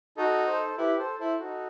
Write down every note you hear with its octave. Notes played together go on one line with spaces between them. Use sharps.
D#4 F#4 A4
A4 C5
E4 G4 B4
A4 C5
E4 A4 C5
D#4 F#4 A4